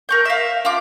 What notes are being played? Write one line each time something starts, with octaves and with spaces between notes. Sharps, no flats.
A#4 C#6 G6
E5 F5
F4 C6 D6